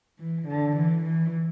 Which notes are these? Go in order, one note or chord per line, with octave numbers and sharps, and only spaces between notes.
E3
D3
E3
E3